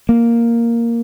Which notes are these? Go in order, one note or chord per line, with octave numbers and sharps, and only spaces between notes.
A#3